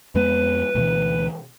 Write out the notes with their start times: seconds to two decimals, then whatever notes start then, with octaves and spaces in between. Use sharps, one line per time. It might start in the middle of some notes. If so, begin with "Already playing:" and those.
0.15 F2 G#3 B3 B4
0.75 D2 B2 E3